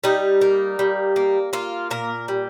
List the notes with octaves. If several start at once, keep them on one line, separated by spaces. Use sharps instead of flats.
G3 D#4
A#3
G3
A#3
A#3 F4
A#2 A#4
G3